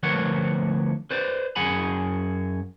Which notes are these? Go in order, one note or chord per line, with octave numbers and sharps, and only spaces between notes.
D2 F3 A#4 B4 C#5 F#5
B4 C5 D5
F#2 G#4 F#5 G#5 B5